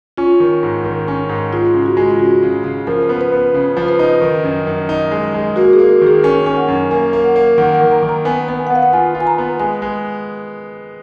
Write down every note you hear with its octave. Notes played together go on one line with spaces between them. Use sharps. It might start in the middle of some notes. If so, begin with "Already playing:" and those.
C#4 F4
D#3
G#2
D#3
C#4
G#2
G#3 F4
C#3
F#4
G#3
F4
C#3 F#4
C#3
C#3
F3 A#4
B3
B4
B3
C#3
F3
B4
D#4
D#3
F#2
F#2
D#4
G#3
G#3
A#3 F#4
G#4
A#3
F#4
D#3 G#4
C#4 A#4
C#4
F#5
F#2
A#3 G#5
A#3
F#5
A#3
D#3 F#5
F#5
D#3
A#5
D#3
A#5
B3 G#5
B3
G#5
F#5
B3 F5
F#5
F4 G#5
F4
G#5
A#5
B3
G#3 G#5
G#3